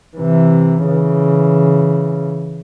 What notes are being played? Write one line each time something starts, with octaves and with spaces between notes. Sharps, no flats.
C3 E3
C#3 E3